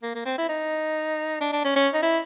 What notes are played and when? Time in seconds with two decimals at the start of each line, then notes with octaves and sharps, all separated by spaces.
0.03 A#3
0.15 A#3
0.25 C4
0.38 E4
0.49 D#4
1.41 D4
1.53 D4
1.64 C#4
1.76 C#4
1.94 D#4
2.02 E4